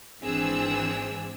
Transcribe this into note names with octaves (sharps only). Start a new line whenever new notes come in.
G#1 E3 C4 D4 G#4 E6